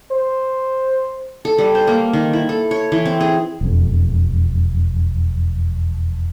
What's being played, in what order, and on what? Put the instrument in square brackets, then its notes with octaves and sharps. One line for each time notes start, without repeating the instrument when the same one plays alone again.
[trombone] C5
[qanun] A4
G3
C5
A#3
D#3
E4
A4
C#5
E3
C4
G#4
[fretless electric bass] E1 F2